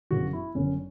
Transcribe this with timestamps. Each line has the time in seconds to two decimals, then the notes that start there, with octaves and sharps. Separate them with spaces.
0.11 G1 F#2 C#3 E3 F#4
0.33 E4
0.55 G1 F#2 D3 C#4